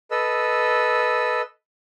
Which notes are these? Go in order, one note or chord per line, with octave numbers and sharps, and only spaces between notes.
A4 B4 D#5 E6